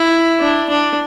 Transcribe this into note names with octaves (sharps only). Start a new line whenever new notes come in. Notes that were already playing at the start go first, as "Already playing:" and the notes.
Already playing: E4
D4
D4